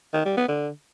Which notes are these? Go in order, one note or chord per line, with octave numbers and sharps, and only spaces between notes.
D#3
G3
B3
D3